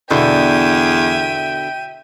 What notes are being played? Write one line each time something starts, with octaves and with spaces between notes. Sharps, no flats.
E2 B2 D3 E5 G5 D#7